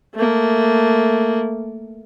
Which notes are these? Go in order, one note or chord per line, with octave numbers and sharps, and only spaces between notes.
A3 A#3